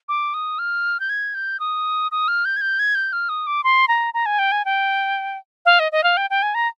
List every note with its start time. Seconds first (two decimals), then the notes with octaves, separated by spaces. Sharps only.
0.09 D6
0.34 D#6
0.59 F6
1.00 G6
1.09 G#6
1.34 G6
1.60 D#6
2.11 D#6
2.28 F6
2.45 G6
2.56 G#6
2.61 G6
2.79 G#6
2.95 G6
3.13 F6
3.29 D#6
3.47 D6
3.64 C6
3.88 A#5
4.14 A#5
4.26 G#5
4.39 G5
4.52 G#5
4.65 G5
5.65 F5
5.79 D#5
5.92 D#5
6.03 F5
6.17 G5
6.30 G5
6.42 G#5
6.54 A#5